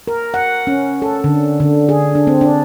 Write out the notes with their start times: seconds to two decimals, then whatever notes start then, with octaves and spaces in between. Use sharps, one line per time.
0.08 A#4
0.34 F#5
0.67 C#4
1.02 A4
1.24 D3
1.60 D3
1.89 G#4
2.15 D4
2.27 C4
2.41 D4